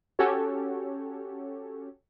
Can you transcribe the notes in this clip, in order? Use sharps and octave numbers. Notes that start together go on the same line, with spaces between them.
C#4 F#4 G4 A4 C#5